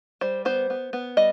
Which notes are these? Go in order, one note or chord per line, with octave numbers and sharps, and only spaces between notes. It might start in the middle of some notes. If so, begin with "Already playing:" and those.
G3 C5
B3 C5
B3
B3
G3 D#5